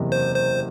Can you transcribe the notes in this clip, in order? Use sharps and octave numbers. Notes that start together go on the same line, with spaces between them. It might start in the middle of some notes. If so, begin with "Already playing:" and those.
Already playing: F#1 E2 C3
C5
C5